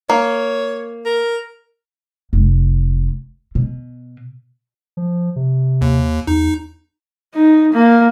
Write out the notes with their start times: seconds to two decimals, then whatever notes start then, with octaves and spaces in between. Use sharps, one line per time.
0.09 A#3 C#5
1.05 A#4
2.33 F1
3.55 B2
4.97 F3
5.36 C3
5.81 D#2
6.27 E2 D#4
7.34 D#4
7.73 A#3